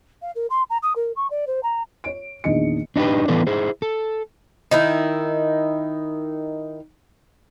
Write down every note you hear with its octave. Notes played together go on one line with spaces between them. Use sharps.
F5
A#4
C6
A#5
D#6
A#4
C#6
D5
C5
A#5
C#5 D7
A#1 E2 D#3 D4 D#5 C#7
D4 D#4 G4 B4
E3 B3 A4 B4 D5
E4 G#4 C5
A4
D#3 D#4 E4